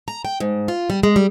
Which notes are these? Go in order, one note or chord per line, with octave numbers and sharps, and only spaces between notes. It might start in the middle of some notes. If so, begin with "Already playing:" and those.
A#5
G5
G#2
F4
G3
G#3
G3